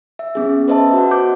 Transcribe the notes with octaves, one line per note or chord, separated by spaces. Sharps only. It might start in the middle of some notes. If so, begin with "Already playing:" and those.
E5
B3 C#4 G#4
B4 C5 D#5 E5 A5
F#4 F#5
C5 D6 G6